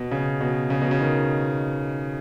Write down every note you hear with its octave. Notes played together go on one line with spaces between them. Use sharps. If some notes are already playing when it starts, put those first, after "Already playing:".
Already playing: B2
C#3
B2
C#3
B2
C#3
D#3